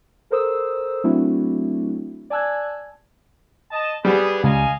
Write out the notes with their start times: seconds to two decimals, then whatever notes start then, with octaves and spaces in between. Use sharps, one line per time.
0.30 A4 A#4 C5 D#6 E6
1.04 F#3 A3 C4 D4 E4 F#4
2.30 D5 G#5 A5 E6 F#6 G#6
3.71 D#5 A5
4.05 G3 B3 G#4
4.44 C#2 D#5 F5 G#5